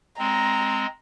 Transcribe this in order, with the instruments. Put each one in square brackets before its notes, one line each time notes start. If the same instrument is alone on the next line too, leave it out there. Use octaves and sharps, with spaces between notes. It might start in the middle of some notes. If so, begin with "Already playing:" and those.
[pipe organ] G#3 C4 [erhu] A#5